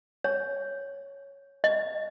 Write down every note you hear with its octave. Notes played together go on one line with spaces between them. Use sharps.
C#5
D#5